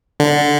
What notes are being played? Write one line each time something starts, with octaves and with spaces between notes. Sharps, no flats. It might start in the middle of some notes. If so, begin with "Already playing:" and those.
D3